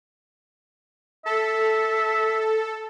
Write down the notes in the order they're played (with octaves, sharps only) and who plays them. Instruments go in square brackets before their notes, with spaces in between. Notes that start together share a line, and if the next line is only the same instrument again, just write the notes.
[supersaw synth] A4 [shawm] E5